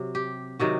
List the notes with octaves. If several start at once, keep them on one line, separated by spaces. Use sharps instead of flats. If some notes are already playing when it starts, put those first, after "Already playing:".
Already playing: C3 F#3
G4
C3 D#3 F#3 F#4